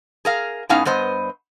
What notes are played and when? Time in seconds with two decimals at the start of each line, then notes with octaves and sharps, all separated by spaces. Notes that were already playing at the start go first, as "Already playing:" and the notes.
0.25 G#4 A#4 F5
0.69 A2 B3 C#4 D#4 F5 F#5
0.85 G2 B3 C5 D#5